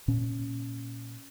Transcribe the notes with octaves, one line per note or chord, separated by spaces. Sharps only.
A#2 C#4